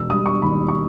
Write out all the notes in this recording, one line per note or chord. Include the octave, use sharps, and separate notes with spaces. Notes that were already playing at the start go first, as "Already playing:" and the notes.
Already playing: E1 E6
G3 D#6
C#6
D#2 B5
C#6